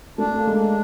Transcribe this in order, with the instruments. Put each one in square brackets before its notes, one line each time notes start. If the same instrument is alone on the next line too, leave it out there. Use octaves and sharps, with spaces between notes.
[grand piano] A3 [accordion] D4
[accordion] A#3
[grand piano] G#3
[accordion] D4